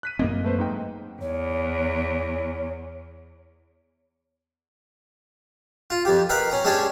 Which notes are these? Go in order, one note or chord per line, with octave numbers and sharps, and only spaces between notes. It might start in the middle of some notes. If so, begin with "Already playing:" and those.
F#6 B6 D#7
F#2 A#3 C4 D#5 B6
A3 B4 C5
G#2 D#4 G5
E2 C#5
F4
F2 G4
A#4 B4 D#5 F5 G5
C#4 A#5
G#3 C#4 D4 G4 G#5